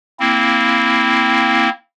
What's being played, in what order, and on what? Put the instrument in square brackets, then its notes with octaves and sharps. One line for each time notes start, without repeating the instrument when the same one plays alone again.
[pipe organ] A#3 C4 E4